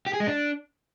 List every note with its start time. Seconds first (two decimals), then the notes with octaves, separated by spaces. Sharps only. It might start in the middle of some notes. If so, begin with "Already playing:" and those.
0.06 G4
0.13 G#4
0.20 G#3
0.27 D4